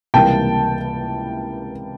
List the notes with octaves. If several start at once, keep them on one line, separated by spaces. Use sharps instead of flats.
C#2 C3 E3 G3 A#3 G5 A5